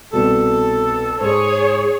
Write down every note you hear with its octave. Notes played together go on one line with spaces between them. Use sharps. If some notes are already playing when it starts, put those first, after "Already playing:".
C2 B2 A4
G#2 G#4 C5 C#5